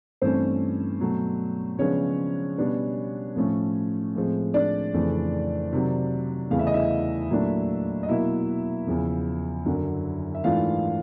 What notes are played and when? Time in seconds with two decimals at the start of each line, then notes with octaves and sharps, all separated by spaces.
0.22 G2 E3 A3 C4 C#4 C5
1.00 B2 F#3 A3
1.78 C#3 F3 G#3 B3 C#4 D4 C#5
2.58 B2 G3 B3 D4
3.36 A2 F3 A3 C#4
4.15 A2 F3 G#3 C4
4.54 D4 D5
4.94 F2 C#3 E3 A3
5.73 C3 D#3 F#3
6.50 E2 C#3 E3 A3 F5
6.59 E5
6.67 D#5
6.73 E4 E5
7.30 A#2 F#3 A3 D4
8.03 D#5
8.08 B2 F#3 A#3 E4 E5
8.87 E2 C#3 F3
9.65 F#2 D3 F#3
10.35 E5
10.44 G#2 E3 A3 D4 F4 F5